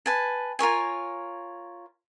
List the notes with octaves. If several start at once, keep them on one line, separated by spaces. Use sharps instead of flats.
B4 G#5 A5
F4 A#4 C#5 G#5